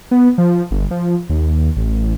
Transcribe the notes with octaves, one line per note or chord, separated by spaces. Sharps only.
B3
F3
G1
F3
D#2
A1